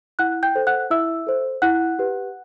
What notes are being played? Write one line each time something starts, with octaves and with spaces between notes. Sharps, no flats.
E4 F#5 F#6
G5 G6
A4 C5
F#5 F#6
E4 E5 E6
A4 C5
E4 F#5 F#6
G4 B4